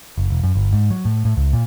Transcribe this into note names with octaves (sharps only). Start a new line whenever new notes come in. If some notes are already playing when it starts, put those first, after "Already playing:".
F#1
E1
F#2
G1
G#2
F#3
A2
A2
C#2
A#2